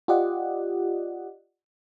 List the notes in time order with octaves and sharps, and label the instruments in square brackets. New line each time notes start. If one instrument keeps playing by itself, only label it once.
[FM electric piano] F4 G4 D5 D#5 F#5